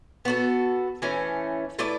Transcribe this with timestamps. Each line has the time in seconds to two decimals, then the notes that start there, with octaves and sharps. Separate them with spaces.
0.25 B3 F#4 A4
1.02 E3 A3 C#4
1.79 A3 E4 B4 D5